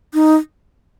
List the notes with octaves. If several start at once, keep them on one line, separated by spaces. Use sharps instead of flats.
D#4